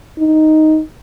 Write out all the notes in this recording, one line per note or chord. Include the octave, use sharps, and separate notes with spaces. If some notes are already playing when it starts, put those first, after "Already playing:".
D#4